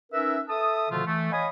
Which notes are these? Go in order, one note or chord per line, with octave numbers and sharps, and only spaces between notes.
C#4 D#4 A#4 B4 E5
A4 E5 A5 D#6
B2 D3 D#3 F3 A3 F4
E3 A3
C#5 D#5 F5 G#5 B5 D#6